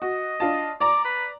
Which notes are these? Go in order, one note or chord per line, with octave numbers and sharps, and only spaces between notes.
F#4 D#5
D4 F4 A5
D5 A#5 D6
B4